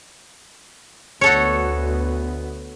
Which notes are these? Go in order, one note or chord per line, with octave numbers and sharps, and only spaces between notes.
D2 B3 F#4 A4 C#5